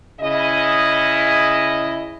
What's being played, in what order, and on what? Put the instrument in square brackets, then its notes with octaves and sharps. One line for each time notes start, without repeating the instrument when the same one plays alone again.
[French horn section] C#3 E4 D#5